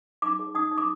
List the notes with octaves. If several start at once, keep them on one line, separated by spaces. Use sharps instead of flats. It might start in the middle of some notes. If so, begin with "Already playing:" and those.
D#4 D6
G#4
D#4 D#6
D#4
D6